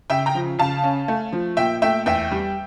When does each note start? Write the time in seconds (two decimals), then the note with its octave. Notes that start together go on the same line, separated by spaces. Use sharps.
0.10 C#3 E5 G5
0.26 G5 A#5
0.35 F3
0.59 C#3 F5 A5
0.84 C#4
1.08 A3
1.33 F3
1.57 A#2 E5 G5
1.82 A3 E5 G5
2.06 E2 E5 G5
2.31 G3